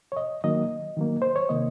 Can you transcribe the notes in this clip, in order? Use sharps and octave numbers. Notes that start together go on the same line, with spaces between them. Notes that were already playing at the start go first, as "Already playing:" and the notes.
C#5
D#5
D#3 F#3 A#3 D#5
D#3 F#3 A#3
C5
C#5
C3 D#3 A#3 D#5